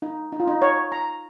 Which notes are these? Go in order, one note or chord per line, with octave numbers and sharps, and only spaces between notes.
D#4
D#4
F4
D#4
C#5
A#5